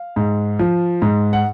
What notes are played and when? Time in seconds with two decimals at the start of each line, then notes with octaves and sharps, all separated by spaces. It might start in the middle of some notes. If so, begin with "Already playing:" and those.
Already playing: F5
0.16 G#2
0.59 F3
1.02 G#2
1.33 F#5